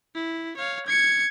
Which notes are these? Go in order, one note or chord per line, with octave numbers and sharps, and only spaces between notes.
E4
C#5 F5
G#6 C#7